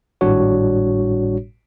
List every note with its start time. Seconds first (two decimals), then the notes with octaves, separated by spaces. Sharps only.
0.21 G#1 A2 G3 D4 F#4 C#5